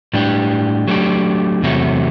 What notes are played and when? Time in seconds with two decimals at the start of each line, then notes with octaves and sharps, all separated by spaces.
0.13 A2 G3 D4 G4
0.88 F#3 A3 D4 G4
1.62 E2 C3 F#3 A3